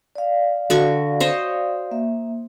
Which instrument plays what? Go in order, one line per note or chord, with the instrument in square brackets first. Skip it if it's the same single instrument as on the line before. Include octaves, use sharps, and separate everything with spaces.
[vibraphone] D5 F5
[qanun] D3 F#4 C#6
C5 C#5 D#5
[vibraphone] A#3 E5